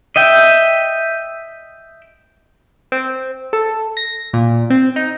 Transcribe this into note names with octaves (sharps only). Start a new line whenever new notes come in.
D#5 E5 G5
C4
A4
A#6
A#2
C4
D#4